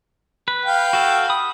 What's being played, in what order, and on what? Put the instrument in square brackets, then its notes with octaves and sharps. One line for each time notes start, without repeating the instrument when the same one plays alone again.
[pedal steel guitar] B4
[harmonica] F5 G5
[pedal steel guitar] F#4 A4
B5 D#6